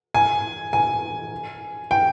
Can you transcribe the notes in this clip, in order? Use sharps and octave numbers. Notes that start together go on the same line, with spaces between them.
G#5
G#5
G5